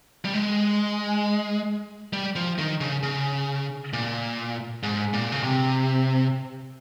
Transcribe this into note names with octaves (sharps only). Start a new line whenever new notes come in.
G3
G#3
G3
F3
D#3
C#3
C#3
A#2
G#2
A#2
C#3
C3